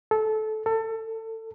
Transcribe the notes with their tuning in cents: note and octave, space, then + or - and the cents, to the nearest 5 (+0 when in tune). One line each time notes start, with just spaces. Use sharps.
A4 -20
A4 +25